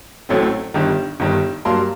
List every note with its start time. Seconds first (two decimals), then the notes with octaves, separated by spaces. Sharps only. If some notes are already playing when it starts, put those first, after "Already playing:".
0.29 A1 A2 F#3 A3 C4
0.74 G1 G2 D#3
1.20 G1 G2 D#3
1.65 G2 F#3 A#3 A5 C6